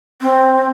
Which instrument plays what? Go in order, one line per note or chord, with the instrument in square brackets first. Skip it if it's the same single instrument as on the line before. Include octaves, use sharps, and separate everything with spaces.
[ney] C4